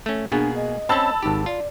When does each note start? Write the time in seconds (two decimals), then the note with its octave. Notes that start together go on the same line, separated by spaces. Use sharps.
0.06 A3 C#4
0.32 B2 A#3 B3 D4 G#4
0.55 D#5
0.89 C4 C#4 A5 B5 E6
1.23 G#1 D#4 G4
1.46 F4 D5